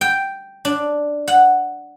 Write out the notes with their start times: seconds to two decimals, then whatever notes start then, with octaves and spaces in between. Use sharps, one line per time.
0.01 G5
0.65 D4
1.28 F#5